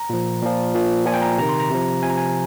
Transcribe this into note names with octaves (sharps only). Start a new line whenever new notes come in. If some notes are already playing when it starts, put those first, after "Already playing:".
Already playing: A#5
A#2 F3
A#2 F3
A#2 F3
A#2 F3 G#5
G5
A#5
C3 D#3 A#5
C6
A#5
C3 F3
C3 F3 G#5
A#5
G#5